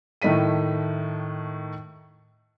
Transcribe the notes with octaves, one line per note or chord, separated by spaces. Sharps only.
A2 D#3 A3 D#5 B6 D#7